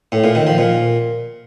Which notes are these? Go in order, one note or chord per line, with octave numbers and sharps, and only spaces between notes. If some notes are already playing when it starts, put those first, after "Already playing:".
A2
A#2
D#3
F3
A#2